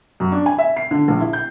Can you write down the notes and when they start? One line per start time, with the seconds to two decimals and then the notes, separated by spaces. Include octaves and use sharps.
0.20 F#2
0.32 D4
0.46 G#5
0.58 E5
0.77 C7
0.91 D3
1.08 A#1
1.20 E4
1.33 G6